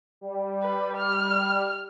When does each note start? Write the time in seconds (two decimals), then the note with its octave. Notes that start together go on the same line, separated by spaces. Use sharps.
0.21 G3
0.63 B4
0.97 F6